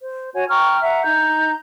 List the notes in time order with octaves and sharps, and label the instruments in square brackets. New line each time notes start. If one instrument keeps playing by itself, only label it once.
[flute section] C5
F#4 C#5 F#5 G#5
G5 A#5 C#6 F6
E5 F#5 A#5
D#4 A#5 G6